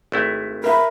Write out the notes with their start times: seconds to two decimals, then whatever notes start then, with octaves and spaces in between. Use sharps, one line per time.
0.12 G#1 A3 E4
0.64 A#4 E5 B5